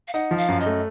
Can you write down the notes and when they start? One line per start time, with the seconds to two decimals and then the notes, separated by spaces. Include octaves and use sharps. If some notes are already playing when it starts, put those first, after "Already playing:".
0.08 F5
0.13 D#4 F#5
0.31 F3
0.37 F5
0.48 F#2
0.61 D#5
0.66 A3